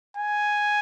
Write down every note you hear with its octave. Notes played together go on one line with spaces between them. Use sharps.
G#5